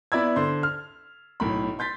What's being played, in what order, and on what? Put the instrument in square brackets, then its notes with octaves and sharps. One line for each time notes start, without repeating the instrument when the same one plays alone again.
[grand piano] B3 E4 D5 B5 E6 G#6
D3 C5 C6
F6
B1 A2 B5
C6 G6 A6 B6